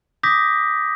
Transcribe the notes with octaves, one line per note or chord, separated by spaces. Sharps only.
D6 D#6 G6 A#6 B6